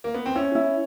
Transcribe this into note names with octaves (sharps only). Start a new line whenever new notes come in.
A#3
B3
C4
C#4 E4
E4